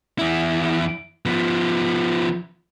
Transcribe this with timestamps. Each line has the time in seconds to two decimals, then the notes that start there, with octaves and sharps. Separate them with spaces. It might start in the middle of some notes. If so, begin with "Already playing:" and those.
0.19 E2 E4
1.26 F3 B3